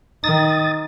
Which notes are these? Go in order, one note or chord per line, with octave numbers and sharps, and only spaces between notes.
D#3 D#6 A6